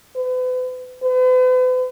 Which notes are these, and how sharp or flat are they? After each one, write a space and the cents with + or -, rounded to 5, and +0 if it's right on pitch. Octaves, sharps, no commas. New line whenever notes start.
B4 +40
B4 +45